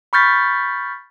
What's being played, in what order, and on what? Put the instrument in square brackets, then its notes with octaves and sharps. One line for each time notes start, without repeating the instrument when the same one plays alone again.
[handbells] B5 C#6 F6 G6 A6 B6